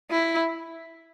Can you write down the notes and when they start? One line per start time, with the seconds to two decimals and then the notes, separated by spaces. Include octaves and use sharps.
0.11 E4